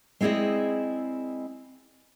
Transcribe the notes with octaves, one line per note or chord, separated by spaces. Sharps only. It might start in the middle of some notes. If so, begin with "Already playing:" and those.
G#3 C4 E4 G#4 D5 D#5